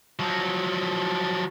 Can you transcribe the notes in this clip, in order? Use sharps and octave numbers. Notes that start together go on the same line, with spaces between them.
F3 F#3